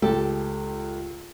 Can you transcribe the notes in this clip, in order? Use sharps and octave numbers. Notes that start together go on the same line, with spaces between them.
C#2 G4 A4